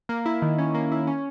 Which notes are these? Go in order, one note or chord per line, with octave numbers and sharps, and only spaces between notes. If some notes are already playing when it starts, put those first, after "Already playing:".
A#3
E4
D#3
C#4
A#3
E4
C#4